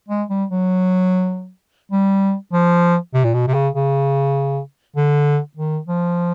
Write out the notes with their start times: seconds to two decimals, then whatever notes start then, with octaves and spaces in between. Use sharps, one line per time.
0.09 G#3
0.30 G3
0.50 F#3
1.91 G3
2.53 F3
3.14 C3
3.24 A#2
3.34 B2
3.48 C3
3.54 C#3
3.75 C#3
4.96 D3
5.57 D#3
5.87 F3